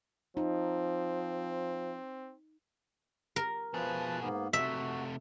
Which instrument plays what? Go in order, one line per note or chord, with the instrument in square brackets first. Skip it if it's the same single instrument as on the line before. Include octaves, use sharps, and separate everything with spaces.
[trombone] F3 [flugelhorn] C4 [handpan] D#4
[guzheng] A#4
[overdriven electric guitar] B2 G#4 [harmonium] F3 B4 A5
[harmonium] G#2 A#3 B3
[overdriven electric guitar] C3 A3 [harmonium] F#4 [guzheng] E5